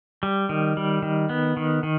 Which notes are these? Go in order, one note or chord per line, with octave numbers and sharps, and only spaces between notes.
G3
D#3
G3
D#3
B3
D#3
D#3